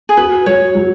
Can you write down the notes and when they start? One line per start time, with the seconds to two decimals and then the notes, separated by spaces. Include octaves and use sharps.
0.09 G#4
0.17 F#4 B4
0.46 F#3 C#5
0.75 F#3